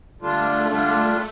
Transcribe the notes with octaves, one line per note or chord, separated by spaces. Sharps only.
D3 G3 A3 D4 F4
D3 G3 D4 F4